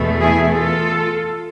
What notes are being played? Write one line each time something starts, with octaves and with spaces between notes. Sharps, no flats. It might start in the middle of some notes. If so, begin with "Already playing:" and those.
Already playing: E2 B2 A3
E4 G#4
F4 A4